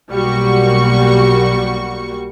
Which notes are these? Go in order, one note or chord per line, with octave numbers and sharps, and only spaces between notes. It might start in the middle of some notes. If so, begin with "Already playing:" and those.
B1 G3 A#3 F#4 C#6